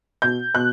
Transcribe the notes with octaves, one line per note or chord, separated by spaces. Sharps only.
B2 G6
B2 F#6